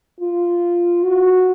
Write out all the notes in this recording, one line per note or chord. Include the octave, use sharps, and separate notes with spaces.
F4
F#4